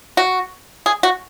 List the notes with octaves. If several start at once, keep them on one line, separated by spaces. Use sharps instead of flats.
F#4
G#4
F#4